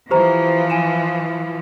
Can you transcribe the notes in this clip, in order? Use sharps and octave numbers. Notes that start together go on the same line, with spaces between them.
E3 F3 G4 C5 A#5
G#5 D#7 E7